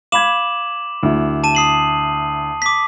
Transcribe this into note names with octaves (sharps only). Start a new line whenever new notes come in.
F5 B5 D6 G#6 E7 F#7
D2 E4
A5 D#7
D#6 C7 F#7
D6 B6